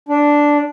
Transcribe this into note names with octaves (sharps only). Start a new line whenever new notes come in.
D4